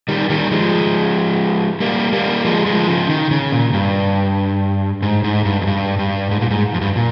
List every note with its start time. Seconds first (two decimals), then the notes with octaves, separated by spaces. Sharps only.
0.08 D#3 G3
0.30 D#3 G3
0.51 F3 G#3
1.80 G3 A#3
2.12 G3 A#3
2.45 F3 G#3
2.66 F3 G#3
2.88 C#3 F3
3.09 D#3
3.31 C#3
3.52 A#2
3.73 G2
5.02 G#2
5.24 G#2
5.45 G2
5.62 F2
5.67 G2
5.99 G2
6.31 G#2
6.41 A#2
6.50 G#2
6.74 F2
6.81 G2
6.96 A#2